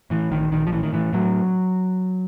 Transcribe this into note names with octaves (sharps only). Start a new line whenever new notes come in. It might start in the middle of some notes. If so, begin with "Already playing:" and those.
A2 E3
A#1 D#3
A#1 D#3
F3
A2 E3
D#3
A2 E3
A2 F#3